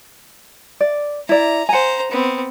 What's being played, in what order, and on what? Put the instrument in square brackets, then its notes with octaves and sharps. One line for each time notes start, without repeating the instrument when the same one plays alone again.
[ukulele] D5
[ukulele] E4 D5 [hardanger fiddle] A#5
[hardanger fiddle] C5 A#5 [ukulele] F#5 G#5
[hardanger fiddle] B3 C4